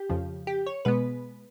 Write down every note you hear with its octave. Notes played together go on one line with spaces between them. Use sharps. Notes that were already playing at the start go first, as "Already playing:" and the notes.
Already playing: G4
F2 C#3 F3
G4
C#5
B2 G#3 B3 B4